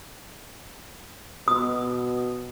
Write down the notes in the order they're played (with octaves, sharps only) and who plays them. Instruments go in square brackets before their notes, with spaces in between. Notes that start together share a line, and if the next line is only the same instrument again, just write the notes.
[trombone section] B2 [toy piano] D#6